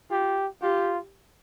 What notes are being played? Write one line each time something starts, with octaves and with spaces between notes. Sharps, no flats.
F4 G4
F4 G4